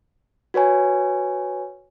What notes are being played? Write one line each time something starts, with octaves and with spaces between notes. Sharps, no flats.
F#4 B4 C#5 G#5